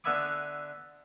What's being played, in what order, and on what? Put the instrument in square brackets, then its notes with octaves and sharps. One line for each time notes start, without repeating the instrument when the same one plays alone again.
[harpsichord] D3 B3 E5 G#5 B5 D6